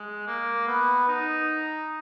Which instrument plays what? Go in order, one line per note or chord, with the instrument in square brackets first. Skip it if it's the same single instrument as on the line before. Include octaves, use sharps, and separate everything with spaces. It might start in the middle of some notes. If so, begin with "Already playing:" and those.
Already playing: [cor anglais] G#3
A#3
B3
D#4